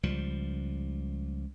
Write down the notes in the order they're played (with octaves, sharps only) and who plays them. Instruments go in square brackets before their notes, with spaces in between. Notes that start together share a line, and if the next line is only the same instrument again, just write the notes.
[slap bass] C#2 F3 G3